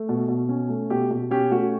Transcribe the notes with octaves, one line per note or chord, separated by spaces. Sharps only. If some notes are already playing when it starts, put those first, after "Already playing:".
Already playing: A3
B2
B2
C#4
A3
B2 G4
B2
C#4 G4
A3 F#4